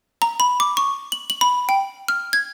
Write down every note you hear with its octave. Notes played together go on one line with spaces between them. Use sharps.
A#5
B5
D6
C#6
F#7
F#7
B5
G5
F6
G#6